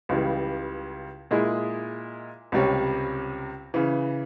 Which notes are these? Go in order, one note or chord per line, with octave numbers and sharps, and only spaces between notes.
C#2 C#3 E3 G3
A#2 G#3 E4 G#4
C#2 C3 G3 C#4
C#3 E3